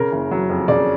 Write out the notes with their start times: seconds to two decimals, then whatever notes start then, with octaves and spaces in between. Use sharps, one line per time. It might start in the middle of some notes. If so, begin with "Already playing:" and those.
Already playing: C#3 A#4
0.12 F#1
0.31 F#3
0.50 F2
0.68 C#3 D5